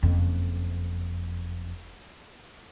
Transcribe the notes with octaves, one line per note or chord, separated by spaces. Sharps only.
F#1 F2